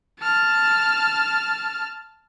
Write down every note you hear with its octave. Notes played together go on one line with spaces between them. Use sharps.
A5 F6